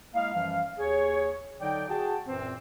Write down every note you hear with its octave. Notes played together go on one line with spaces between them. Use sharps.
G#3 A#3 E4 D#5 F5
F#2 E3 F3 G3 F5
D#2 G#4 C#5
D3 F#3 D#4 D5 G5
F#4 G#4 G5 A5
F#2 A#2 E3 C4